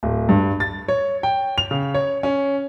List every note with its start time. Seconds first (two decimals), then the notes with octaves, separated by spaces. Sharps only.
0.03 D1
0.29 G2
0.60 A6
0.88 C#5
1.23 G5
1.58 F7
1.71 C#3
1.94 C#5
2.23 C#4